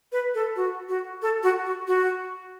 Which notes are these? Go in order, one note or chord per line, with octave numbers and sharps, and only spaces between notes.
B4
A4
F#4
F#4
A4
F#4
F#4
F#4